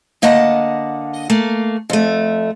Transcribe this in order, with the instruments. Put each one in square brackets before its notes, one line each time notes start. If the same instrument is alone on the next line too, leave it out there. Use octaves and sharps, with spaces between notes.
[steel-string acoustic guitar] D3 A#3 D#5 F#5 A5
A3 A#3
F2 A3